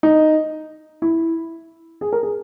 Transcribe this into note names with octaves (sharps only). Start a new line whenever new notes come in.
D#4
E4
G#4
A#4
G#4